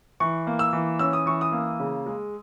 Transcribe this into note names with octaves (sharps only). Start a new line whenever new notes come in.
E3 C#6
A#3
E6
E3
C#4 E6
D#6
E3 C#6
D#6
A#3
C#3
G#3